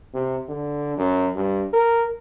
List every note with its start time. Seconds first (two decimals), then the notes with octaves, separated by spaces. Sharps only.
0.14 C3
0.49 D3
0.97 F#2
1.35 G2
1.73 A#4